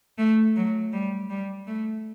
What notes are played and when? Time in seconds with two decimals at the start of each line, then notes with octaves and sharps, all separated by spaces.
0.18 A3
0.56 F#3
0.93 G3
1.30 G3
1.67 A3